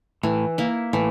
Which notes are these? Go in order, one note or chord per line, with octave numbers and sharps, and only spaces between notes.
A2 E3
A#3 E4
A2 E3